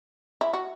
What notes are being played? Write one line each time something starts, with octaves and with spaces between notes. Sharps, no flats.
E4
F#4